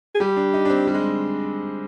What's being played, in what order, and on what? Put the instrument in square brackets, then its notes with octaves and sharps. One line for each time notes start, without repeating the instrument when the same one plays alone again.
[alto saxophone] G#4
[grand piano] G3 [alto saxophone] G4
[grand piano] D4
D#4
D4
C4
G3
G#3